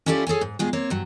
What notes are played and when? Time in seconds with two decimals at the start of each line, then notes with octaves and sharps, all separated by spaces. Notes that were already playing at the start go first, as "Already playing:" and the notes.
0.06 C#4 E4 F4 G4 A4 D5
0.27 G#4 A4 C#5 G#5
0.41 G#2
0.59 G2 B2 G#3 F4 G#4
0.73 A#3 C4 C#5
0.90 G2 F#3